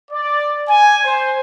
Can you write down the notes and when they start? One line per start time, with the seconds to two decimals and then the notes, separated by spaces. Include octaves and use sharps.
0.11 D5
0.69 G#5
1.05 C5